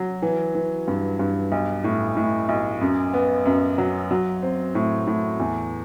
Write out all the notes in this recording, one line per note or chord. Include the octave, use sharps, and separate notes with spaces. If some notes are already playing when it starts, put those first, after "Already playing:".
Already playing: F#3
E3
E3
G2
G2
B1
A2
A2
B1
F#2
B3
F#2
F#3
F#3
C4
A2
A2
E2